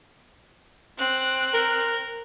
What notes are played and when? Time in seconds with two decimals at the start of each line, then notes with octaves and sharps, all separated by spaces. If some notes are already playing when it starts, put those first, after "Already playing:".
0.98 C4 F#6
1.54 A#4